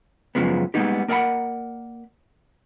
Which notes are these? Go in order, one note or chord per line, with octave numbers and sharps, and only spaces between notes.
F#2 A#2 C#3 F3 G#3 B3
G3 G#3 A#3 B3 D#4 G4
A#3 A#4 D5 F5 F#5 B5